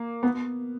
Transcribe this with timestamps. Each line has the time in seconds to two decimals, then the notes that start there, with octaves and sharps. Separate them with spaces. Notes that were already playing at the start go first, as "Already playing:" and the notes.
Already playing: A#3
0.23 B3